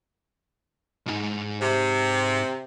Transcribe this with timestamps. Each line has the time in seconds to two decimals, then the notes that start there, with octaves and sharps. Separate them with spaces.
1.07 B1 G#2
1.60 C3